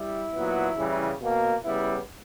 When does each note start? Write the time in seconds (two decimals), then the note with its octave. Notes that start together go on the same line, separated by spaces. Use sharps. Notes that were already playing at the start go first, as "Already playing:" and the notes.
Already playing: G3 E4
0.33 A#2 F#3 B3
0.77 C#3 E3 G3
1.20 B2 A#3
1.63 C#3 G3 B3 E4